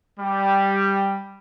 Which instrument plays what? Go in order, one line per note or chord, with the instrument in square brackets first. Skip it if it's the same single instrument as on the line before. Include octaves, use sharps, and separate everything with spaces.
[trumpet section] G3